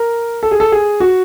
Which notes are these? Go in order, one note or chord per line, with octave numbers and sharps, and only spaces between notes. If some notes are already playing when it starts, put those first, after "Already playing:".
Already playing: A#4
A4
G#4
A4
G#4
F#4